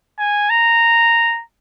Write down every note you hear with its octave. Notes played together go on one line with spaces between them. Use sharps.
G#5
A#5